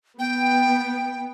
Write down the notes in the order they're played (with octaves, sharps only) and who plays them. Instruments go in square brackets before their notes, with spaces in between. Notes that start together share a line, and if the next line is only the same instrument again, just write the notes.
[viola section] B3 [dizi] G5